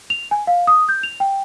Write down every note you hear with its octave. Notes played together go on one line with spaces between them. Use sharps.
F7
G#5
F5
D#6
G6
F7
G5